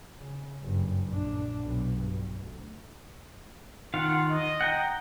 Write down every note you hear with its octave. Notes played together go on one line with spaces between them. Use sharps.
C#3
F#1 G2
A#1 D4
B1 B2
G2
D2
D#3 F4 F5 F#5
D#5
F#5 G5 A#5